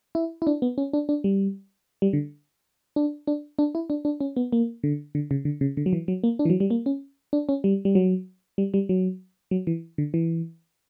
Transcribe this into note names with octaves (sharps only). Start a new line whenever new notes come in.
E4
E4
D4
B3
C#4
D4
D4
G3
G3
D3
D4
D4
D4
E4
D4
D4
C#4
B3
A#3
D3
D3
C#3
D3
C#3
D3
F#3
E3
F#3
A#3
D4
E3
F#3
G3
A#3
C#4
D4
C#4
G3
G3
F#3
G3
G3
F#3
F#3
E3
D3
E3